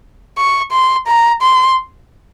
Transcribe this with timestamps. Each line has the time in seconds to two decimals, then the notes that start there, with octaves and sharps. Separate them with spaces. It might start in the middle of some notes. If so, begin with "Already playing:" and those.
0.38 C#6
0.72 C6
1.08 A#5
1.42 C6